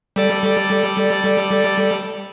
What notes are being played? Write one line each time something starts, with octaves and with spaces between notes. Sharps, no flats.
G3 A4 D5